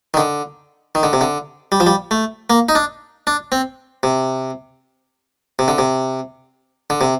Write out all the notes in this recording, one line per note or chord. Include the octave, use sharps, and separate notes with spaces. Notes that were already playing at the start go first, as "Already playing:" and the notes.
D#3
D3
D#3
D3
C3
D3
G3
F3
G3
A3
A#3
D#4
D4
D4
C4
C3
C3
D3
C3
D3
C3